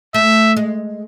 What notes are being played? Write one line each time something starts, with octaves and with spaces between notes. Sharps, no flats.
A3 E5
G#3